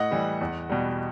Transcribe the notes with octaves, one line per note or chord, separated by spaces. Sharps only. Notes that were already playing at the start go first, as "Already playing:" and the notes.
Already playing: A2 D#5 F#5
E3 G3
E2
B2 G3